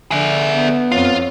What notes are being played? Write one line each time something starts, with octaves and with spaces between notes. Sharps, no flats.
D3 G#4 E5
B3
F2 F4 C#5